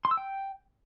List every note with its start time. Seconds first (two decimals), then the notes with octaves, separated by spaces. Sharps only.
0.05 C6
0.11 E6
0.17 G5